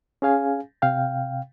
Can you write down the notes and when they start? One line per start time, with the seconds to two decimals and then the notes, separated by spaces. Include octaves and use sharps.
0.22 C#4 G#4 F5 G#5
0.82 C3 F5 G5